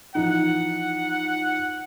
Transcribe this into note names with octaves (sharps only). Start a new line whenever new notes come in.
E3 F3 D#4 F#5